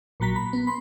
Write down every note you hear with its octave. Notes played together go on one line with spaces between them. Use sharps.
A#1 A#2 F#3 A#5 B6
B5
B3
B5 C6